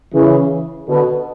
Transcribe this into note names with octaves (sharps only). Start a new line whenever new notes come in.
C#3 E3
B2 D3